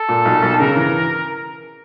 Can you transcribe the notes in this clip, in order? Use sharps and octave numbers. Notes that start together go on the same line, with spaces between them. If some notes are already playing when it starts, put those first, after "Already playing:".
Already playing: A4
A#2
B1
B1
C#3 A#4
E3